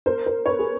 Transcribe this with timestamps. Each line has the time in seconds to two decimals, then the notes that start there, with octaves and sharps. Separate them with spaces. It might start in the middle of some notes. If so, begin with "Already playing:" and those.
0.06 A#4 C5
0.26 A#4 C5
0.46 B4 C#5
0.59 G#4 A#4